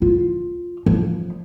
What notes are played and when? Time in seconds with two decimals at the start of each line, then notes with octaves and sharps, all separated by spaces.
0.02 F4
0.86 F3